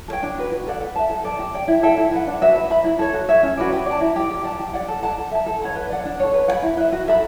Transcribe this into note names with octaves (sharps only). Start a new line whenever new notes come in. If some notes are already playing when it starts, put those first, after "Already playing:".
A4 C#5 G5
D4
F#4 B4
F#4
A4 D5 F#5
B4
E5 A5
A4
D5 A5
G4
D5 G5
E4
A4 E5 G5
E4
B4 F#5
D4
F#4 B4 E5
B4
E5 B5
E4
A4 C#5
F#4
C#5 E5
C#4
F#4 B4 D5
G4
D5 A5
E4
G4 D5
G4
D5 F#5 A5
G4
D5 F#5
A4
D5 F#5 A5
A4
E5 A5
A4
C#5 F#5 B5
B4
D5 F#5
D4
A4 C#5
B4
F#5
B5
E4
B4 E5
F#4
A4 E5 B5